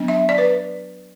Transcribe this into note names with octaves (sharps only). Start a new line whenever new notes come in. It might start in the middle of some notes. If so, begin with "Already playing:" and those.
Already playing: F#3 B3 D4
E5
D5
B4